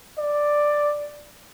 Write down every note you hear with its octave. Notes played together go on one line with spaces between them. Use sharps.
D5